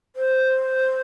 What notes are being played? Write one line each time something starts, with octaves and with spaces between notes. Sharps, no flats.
C5